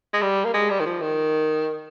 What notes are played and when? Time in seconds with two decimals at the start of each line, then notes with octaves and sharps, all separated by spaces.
0.14 G#3
0.22 G3
0.45 A#3
0.54 G#3
0.70 G3
0.80 D#3
0.86 F3
1.01 D#3